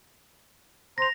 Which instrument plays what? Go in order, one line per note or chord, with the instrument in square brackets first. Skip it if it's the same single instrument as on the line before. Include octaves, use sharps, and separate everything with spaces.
[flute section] C5 A#5 C6 [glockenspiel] A#6 F7